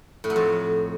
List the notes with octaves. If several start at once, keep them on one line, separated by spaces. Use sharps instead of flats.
A2
F#3
F2